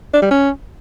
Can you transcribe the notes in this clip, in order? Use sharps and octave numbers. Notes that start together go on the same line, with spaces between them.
D4
G3
C#4